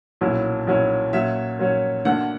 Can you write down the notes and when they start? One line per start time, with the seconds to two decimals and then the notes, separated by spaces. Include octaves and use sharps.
0.21 B1 A#2 F#3 C#4 E4
0.67 B1 A#2 F#3 C#4 E4
1.13 A#2 F#3 C#4 E5
1.59 A#2 F#3 C#4
2.05 D2 D3 A#3 F#5